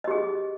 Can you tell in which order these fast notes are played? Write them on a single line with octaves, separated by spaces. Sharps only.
D#5 G4 G#4